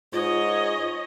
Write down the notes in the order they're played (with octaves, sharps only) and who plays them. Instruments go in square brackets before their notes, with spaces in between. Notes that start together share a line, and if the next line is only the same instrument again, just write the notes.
[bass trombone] G#2 [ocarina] F4 [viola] C#5 D#5